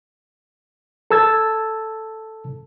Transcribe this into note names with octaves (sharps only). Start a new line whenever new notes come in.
A4 A5 E6 G#6 A6